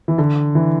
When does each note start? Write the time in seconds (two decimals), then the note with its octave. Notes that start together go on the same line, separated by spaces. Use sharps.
0.08 E3
0.18 D3
0.55 E3